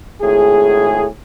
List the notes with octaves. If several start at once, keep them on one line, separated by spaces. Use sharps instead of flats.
G#1 A2 G#4